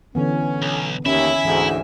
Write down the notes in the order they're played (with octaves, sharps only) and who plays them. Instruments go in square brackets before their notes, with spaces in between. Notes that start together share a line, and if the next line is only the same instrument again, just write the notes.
[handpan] D3 E3 B3 [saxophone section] C#4
[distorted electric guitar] B1
[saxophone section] D#2 [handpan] C#4 [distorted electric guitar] E4 [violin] E5 G#5
[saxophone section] D2 G#2 [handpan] E3